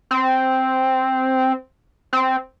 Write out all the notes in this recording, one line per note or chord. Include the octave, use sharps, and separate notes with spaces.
C4
C4